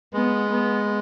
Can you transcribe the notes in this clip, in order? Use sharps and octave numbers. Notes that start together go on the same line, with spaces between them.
G#3 B3
B3